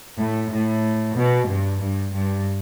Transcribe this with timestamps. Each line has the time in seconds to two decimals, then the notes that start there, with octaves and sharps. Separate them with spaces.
0.17 A2
0.50 A2
1.15 B2
1.47 G2
1.80 G2
2.12 G2